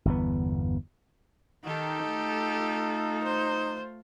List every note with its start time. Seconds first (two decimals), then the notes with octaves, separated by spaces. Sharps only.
0.05 G1 E2 B3
1.65 D#3 D#4 G4 A4
2.08 A3 F4
3.24 C5